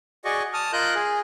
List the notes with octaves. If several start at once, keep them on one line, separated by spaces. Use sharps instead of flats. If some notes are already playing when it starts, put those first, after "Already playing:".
F#4 G#4 D5 D#5 C#6
A5 D#6 F6
F4 A#4 D#5 F#6 G6
G#4